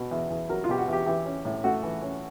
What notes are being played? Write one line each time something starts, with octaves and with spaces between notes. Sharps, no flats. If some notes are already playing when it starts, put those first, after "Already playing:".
Already playing: B2
E2
E2
F#3 A#4
F4
B2 G4
F#4
E2
G4
E3 G4
C#4
A2
A3 F#4
E3
C#4